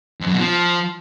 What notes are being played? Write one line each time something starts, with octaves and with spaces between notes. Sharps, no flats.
F2
F#2
B2
F3